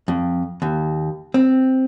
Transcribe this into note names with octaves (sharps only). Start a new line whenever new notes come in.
F2
D#2
C4